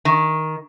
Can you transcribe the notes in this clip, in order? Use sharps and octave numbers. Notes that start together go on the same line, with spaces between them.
D#3